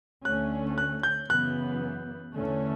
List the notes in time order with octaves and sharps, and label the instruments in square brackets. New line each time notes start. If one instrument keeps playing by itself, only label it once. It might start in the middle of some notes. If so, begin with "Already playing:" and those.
[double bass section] D2 D3 A3 C#4 [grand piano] F#6
[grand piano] F#6
G6
[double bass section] F#2 C#3 E3 B3 [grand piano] F#6
[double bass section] E2 D3 A3 C#4